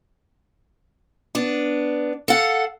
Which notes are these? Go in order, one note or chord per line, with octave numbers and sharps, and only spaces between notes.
B3 D4
A4 F5 F#5